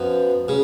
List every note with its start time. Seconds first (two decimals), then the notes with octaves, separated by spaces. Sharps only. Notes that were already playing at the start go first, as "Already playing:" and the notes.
Already playing: F#2 F3 B3
0.48 C#3